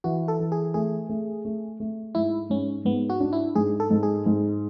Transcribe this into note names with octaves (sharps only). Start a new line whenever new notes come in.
E3 F#4
A4
E3
G#4
A3 G#4
A3
A3
A3
G#2 E4
G#2 C#4
G#2 B3
F#4
D4
E4
G#2 G#4
A4
G#2
G#4
G#2